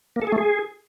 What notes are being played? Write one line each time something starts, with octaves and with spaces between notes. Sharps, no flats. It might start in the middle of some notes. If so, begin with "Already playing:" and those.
A#3
A4
G#4
A3
G#4